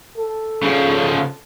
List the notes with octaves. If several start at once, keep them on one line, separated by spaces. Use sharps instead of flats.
A4
C#3 F3